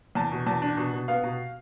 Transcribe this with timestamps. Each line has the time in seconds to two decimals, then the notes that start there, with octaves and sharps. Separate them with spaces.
0.15 E2 A5
0.31 B2
0.46 E2 A5
0.62 D4
0.77 B2
0.93 B2
1.08 B3 F5
1.24 B2